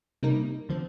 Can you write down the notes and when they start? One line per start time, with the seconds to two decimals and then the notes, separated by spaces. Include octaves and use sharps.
0.23 C3 G3 A#3 D#4 A#4
0.69 D3 F3 C4